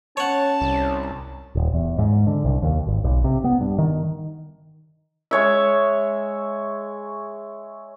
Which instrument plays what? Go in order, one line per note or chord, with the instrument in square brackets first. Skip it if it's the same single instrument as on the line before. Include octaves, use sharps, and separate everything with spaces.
[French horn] C#4 [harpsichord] C#5 F#5 [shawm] A5
[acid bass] C2
[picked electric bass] D#1
E2
G#2
D3
C2
D#2
G#1
B1
C3
B3
G2
D#3
[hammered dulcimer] G#3 C#5 E5